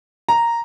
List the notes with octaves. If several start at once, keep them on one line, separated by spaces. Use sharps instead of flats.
A#5